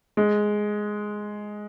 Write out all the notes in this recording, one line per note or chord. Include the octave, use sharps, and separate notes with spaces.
G#3